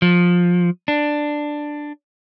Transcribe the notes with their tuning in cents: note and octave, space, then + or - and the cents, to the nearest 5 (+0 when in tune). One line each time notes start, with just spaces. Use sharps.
F3 +15
D4 +10